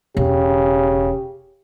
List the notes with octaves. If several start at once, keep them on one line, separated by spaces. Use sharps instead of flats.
E1 C#3 G4